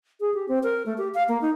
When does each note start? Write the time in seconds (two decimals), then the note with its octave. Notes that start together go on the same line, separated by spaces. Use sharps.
0.21 G#4
0.34 G4
0.48 C4
0.63 A#4
0.86 A3
0.98 G4
1.14 F5
1.29 A#3
1.41 D#4